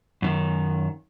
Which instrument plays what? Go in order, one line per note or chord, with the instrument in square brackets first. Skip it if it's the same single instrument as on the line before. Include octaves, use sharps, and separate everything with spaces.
[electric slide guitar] F#2 D#3